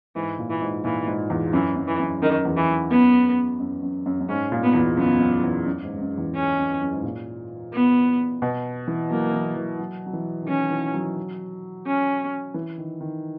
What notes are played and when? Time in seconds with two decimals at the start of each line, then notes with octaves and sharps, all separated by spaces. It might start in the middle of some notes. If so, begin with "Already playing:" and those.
0.16 G#2 E3
0.39 A#2
0.50 E3
0.62 G#2
0.84 A#2 E3
1.07 G#2
1.30 E2
1.53 F#2 E3
1.76 F#2
1.88 E3
1.99 F#2
2.22 F#2 D#3
2.45 E2
2.57 E3
2.68 F#2
2.91 F#2 B3
3.60 F#2
3.82 F#2
4.06 F#2
4.20 F#2
4.29 G#2 C#4
4.52 A#2
4.63 B3
4.74 E2
4.97 F#2 B3
5.20 F#2
5.43 E2
5.66 F#2
5.84 G#2
5.96 G#2
6.01 F#2
6.18 E2
6.35 C#4
6.58 F#2
6.81 F#2
6.93 G#2
7.03 A#2
7.73 B3
8.42 B2
8.88 E3
9.11 F#3 A#3
9.33 E3
9.56 E3
9.79 F#3
10.06 F#3
10.13 E3
10.43 D#3
10.48 E3 C#4
10.71 E3
10.94 F#3
11.86 C#4
12.54 E3
12.78 D#3
13.01 D#3